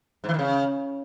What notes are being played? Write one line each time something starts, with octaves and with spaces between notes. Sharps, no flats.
G#2
E3
D#3
C#3